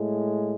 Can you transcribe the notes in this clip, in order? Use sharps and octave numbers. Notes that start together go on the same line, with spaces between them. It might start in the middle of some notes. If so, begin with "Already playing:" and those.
Already playing: A2 G#3